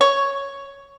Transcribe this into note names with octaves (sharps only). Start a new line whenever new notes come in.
C#5